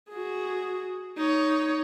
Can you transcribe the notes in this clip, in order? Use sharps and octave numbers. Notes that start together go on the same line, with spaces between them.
F#4 G#4
D#4 C#5